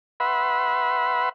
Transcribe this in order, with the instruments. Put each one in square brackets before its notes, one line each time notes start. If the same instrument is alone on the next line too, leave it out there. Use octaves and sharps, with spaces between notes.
[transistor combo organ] B4 E5 F#5 B5 C6